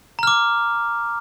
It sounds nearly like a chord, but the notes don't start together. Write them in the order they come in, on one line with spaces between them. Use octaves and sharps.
A#5 F6 D6